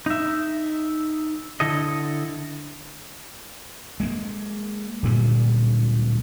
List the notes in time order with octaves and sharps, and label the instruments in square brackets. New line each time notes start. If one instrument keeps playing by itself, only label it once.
[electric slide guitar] D#4 E5
D3 E4 A4 D#5
[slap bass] G#3 A#3
D1 D2 A#2 G3